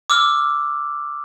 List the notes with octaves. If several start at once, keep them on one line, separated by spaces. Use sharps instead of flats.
D6 E6 F6